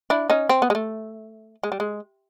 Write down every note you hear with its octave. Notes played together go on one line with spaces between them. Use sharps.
D4 E4
C#4 D#4
C4
B3
G#3
A3
G#3
G3
G#3